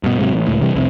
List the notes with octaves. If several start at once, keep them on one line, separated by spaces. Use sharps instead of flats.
G2 B2
G#2 C3 F#3
A1
C#2 A2
C3 E3 G3
C2 F2 C3